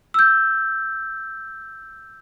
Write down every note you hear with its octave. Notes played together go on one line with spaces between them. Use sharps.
E6 G6